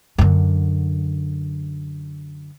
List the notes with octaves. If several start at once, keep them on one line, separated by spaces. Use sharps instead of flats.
F#2 D3